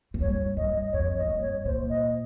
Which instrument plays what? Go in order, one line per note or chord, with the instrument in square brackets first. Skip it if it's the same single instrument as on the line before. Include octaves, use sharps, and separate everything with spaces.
[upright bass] G#2
[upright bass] G2 [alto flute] C#5
[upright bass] G2 [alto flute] D#5
[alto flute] D#5
[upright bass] F2 [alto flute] C#5
[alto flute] D#5
[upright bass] G#2
G2
[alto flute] C#5
[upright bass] A#2 [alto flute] C5
[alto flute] D#5